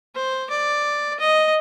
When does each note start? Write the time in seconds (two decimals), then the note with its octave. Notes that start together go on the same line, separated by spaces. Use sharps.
0.15 C5
0.50 D5
1.19 D#5